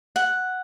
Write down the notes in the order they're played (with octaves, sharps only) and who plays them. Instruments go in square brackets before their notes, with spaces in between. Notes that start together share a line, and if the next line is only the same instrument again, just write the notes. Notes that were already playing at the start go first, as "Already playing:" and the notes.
[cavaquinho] F#5